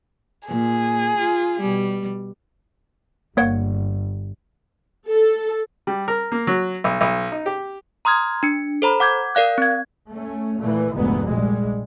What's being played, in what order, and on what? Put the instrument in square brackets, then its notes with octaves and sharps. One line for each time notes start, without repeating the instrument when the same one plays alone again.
[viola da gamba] A#2 [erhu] G#4
[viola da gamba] F4
B2 G3
[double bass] G1 [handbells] A#3 C#5 F#5
[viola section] A4
[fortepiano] G3
A#4
A#3
F#3
B1
B1
D#4
G4
[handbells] A#5 C6 D#6 F6 G#6
D4 C#7
A4 C5 A#5 B5
F#5 D6 G6 G#6
A#4 D5 F5 F#6
C4 G#6
[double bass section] A3 C#4
A#2 E3 A3
F1 D2 G#2 B3
A#1 G3 G#3